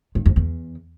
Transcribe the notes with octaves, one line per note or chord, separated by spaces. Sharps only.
G2
F2
E2